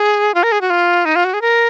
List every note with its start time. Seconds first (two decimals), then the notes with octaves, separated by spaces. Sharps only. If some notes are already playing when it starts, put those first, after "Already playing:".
Already playing: G#4
0.34 F4
0.43 A#4
0.52 G#4
0.61 F#4
0.70 F4
1.05 D#4
1.16 F4
1.25 F#4
1.34 G#4
1.41 A#4